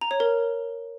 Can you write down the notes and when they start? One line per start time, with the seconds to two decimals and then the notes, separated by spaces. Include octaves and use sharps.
0.01 A#5
0.11 C#5
0.20 A#4